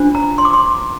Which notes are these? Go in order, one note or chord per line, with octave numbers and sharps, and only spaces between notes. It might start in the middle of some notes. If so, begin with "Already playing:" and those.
Already playing: D4 F4 C5
A#5
C6
D6
C6